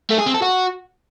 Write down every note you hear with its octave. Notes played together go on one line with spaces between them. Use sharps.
A3
G#4
C4
A4
F#4